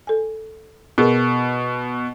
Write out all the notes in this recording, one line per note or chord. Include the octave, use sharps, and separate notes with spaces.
A4 G#5
B2 G#4 A#4